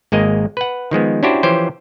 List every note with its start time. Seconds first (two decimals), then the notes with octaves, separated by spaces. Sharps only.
0.12 G#1 G#3 A#3 D#5
0.57 B4 F#5
0.91 D#3 F3 G#3 B3
1.23 C#4 D4 E4 F#4 G4 C5
1.43 E3 F3 C#4 G4 C5